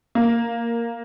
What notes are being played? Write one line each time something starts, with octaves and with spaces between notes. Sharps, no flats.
A#3